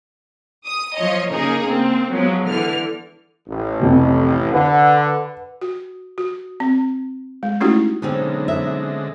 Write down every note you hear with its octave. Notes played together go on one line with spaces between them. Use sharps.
D#6
F3 C#5 D#5
C#3 A#3 D#4 G#4 A#4
A#3 C4
F3 F#3 G#3 B3
D3 E3 F6
A1
F2 C3
D3 B4 F#5
F#4
F#4
C4
G#3
A3 C#4 D#4 E4 F#4 G4
B1 D3 G#3 C4 C#4 D#4
E5